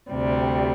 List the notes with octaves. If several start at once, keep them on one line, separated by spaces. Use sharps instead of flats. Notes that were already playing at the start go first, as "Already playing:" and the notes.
D2 C3 G3